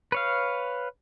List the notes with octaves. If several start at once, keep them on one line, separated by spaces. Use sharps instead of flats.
B4 C#5 F5